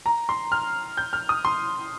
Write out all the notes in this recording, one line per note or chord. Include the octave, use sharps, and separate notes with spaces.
A#5
C6
F6
G6
F6
D#6
C6